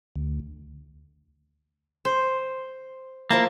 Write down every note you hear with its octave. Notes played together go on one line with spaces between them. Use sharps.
D2
C5
F3 A#3 E4 A5